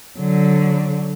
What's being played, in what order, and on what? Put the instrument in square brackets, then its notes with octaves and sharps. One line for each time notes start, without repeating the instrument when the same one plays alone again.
[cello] D3 F#3